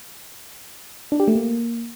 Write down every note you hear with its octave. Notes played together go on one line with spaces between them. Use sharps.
D4
G4
A3
A#3